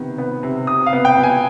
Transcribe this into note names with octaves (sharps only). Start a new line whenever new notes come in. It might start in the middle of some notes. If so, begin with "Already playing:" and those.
Already playing: C3 D#3 B3
B3
C3
C3 D#6
F5
B3
G5
B3
G#5